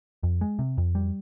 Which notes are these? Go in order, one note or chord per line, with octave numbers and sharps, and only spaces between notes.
F2
G#3
C3
F2
G3